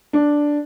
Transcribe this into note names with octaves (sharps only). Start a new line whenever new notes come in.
D4